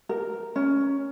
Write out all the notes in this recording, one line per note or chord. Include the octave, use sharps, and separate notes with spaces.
A#4
C#4